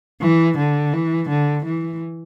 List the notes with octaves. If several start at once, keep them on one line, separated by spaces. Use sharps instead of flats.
E3
D3
E3
D3
E3